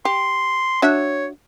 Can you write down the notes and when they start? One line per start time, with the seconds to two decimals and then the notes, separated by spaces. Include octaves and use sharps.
0.05 G4 C6
0.82 D4 F#4 C#5 E5